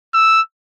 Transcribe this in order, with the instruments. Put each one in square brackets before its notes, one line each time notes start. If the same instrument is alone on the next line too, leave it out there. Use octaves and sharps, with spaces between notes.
[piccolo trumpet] E6